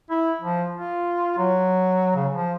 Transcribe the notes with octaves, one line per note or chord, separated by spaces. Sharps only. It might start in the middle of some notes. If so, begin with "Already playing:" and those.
E4
F3
F4
F#3
C#3
F3